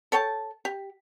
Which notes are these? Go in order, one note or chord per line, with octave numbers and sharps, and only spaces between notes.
A4 C#5 G5 A5
G4